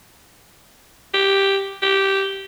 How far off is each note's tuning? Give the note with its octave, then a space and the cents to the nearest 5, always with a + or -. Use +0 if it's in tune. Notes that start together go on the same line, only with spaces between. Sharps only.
G4 +0
G4 -10